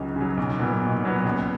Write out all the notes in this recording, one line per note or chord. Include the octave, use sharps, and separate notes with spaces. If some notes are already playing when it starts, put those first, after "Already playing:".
Already playing: C#2 C#3 F#3
C#3 F#3
B1
A#2 F#3 B3
B1
A#2 F#3 B3
C#2